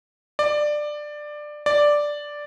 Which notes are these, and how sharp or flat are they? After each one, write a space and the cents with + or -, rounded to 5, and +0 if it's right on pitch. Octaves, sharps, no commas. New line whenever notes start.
D5 +15
D5 +0